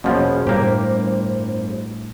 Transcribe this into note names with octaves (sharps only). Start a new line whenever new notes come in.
E1 B2 F3 F#3 A#3 C#4 G#4 C#5
G1 A2 G3 A#3 G4 C5